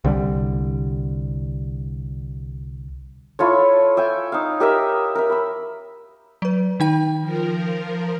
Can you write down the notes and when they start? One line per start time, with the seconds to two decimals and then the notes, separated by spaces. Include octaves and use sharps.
0.05 C2 D3 G3
3.39 E4 F4 A4 C#5
3.97 E5 G5 G#5
4.32 D#4 F5
4.60 G4 A#4 D#5 E5
5.15 A#4 E5
5.30 B5 E6
6.42 F#3 B4
6.80 D#3 D#4 G5
7.21 F3 A#4